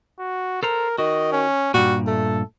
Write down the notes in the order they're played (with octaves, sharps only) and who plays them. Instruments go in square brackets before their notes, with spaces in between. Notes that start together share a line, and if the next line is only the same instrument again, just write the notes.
[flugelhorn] F#4
[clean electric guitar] A4 C5 A#5 [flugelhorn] A#4
[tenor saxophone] D#3 [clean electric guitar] F#4 [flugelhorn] D#5
[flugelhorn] C#4
[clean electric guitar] G2 A#2 [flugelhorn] G3 [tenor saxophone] F#4
[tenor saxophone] A3 [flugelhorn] A4